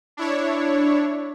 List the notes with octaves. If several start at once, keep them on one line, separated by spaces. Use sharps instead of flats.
D4 E4 C#5